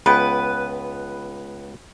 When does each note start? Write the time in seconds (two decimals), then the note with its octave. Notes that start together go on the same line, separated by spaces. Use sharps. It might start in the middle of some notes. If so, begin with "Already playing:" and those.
0.06 C#2 B3 B4 G5